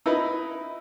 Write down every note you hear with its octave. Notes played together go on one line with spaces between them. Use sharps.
D#4 E4 B4